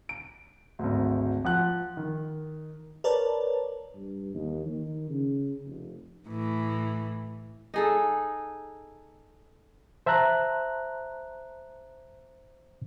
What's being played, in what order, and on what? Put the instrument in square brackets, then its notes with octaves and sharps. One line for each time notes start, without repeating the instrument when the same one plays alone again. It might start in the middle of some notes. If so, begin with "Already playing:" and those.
[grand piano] D7
G#1 D2
F3 F#5 F#6
D#3
[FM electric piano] A#4 B4 C#5 D5 A5
[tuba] G2
D#2
D#3
C#3
F1
[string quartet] A2 E3
[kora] D#4 G#4 A4
[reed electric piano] C5 E5 A5 A#5 F#6